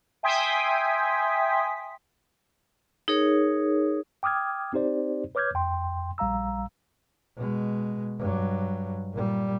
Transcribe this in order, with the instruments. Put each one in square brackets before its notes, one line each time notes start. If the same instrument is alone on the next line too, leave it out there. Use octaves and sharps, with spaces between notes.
[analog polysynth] E5 G5 G#5 C6 D#6 B6
[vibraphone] D#4 G#4 A#4 C#5
[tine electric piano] G5 D6 D#6 F6 G#6
C4 D#4 G4 C5 D5
B4 C#5 D6 F6 G6 G#6
F2 G5 C6
A#1 G3 F5 A#5 E6
[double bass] B2 G#3
G2 F#3
A#2 G3